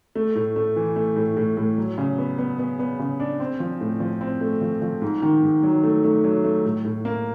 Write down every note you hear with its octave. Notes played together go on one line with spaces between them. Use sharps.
A3
A2
A3
E3
A3
A2
A2
A2
F#3
C#3
B3
B3
B3
B3
C#3
D4
C4
F3
A2
F3
C4
A3
F3
F3
G#2
D#3
G#2
F#3
A3
A3
F#3
A3
A2
A2
A#3